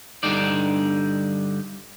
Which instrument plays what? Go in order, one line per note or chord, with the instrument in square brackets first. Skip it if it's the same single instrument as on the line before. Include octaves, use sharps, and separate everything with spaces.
[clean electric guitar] G2 D3 D#4 D5